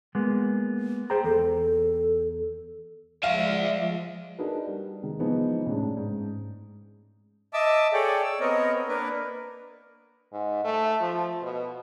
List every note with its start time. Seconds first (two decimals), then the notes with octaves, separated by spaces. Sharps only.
0.15 G#3 A#3 B3
1.10 G#4 C5 G5 A#5
1.24 E2 A4
3.23 F3 G#3 D5 E5 F5
4.39 D4 D#4 F#4 G#4 A#4 B4
4.67 G3
5.02 D#3 G#3
5.19 E3 F3 G#3 B3 D#4
5.66 A1 A2 G#3 D4
5.97 G#2
7.54 D#5 E5 A5 D6 E6
7.93 G#4 A4 C#5 D5 G5
8.23 E6
8.41 B3 C4 A#4 C#5 D#5
8.88 A#3 D4 A#4 B4
10.33 G#2
10.64 A3
11.01 F3
11.42 B2